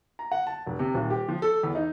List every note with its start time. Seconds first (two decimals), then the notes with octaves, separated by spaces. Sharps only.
0.19 A#5
0.32 F#5
0.47 A5
0.66 F1
0.79 C3
0.94 D#1
1.10 G4
1.28 F3
1.42 A4
1.63 E2
1.75 D#4